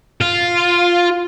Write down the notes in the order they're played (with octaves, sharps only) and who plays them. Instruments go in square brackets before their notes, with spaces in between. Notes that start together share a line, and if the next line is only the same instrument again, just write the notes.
[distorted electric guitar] F4